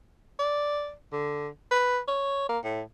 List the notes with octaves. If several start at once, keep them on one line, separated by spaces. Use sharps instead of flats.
D5
D3
B4
C#5
A#3
A2